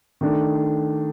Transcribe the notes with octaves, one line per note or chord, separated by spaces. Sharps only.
D#3 A3 D4